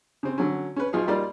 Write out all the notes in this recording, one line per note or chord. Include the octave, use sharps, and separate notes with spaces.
C#3 C4
D3 F#3 C#4
C#4 B4
B1 D#4 F4 G#4
G3 A#3 D#4 F4 D5